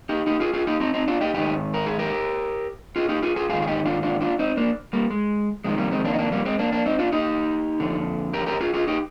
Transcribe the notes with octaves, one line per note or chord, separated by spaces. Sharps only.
D#4 G4
D#4 G4
F4 G#4
F4 G#4
D#4 G4
C4 D#4
C4 D#4
D4 F4
D#4 G4
G#2 D#3 D#4 G4
A#4
G#4
G4 A#4
F4 G#4
D#4 G4
F4 G#4
F4 G#4
G#2 D#3 F4 G#4
G#4
D#4 G4
D4 F4
D4 F4
D4 F4
C4 D#4
A#3 D4
G3 A#3
G#3
F2 C3 D#3 G#3
G3 A#3
G#3 C4
A#3 D4
D#4
A#3 D4
G3 A#3
G#3 C4
A#3 D4
A#3 D4
C4 D#4
D4 F4
D#4 G4
F2 D3
G4 A#4
G4 A#4
F4 G#4
F4 G#4
D#4 G4